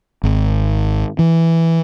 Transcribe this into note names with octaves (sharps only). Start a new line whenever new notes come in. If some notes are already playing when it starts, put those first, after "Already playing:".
G#1
E3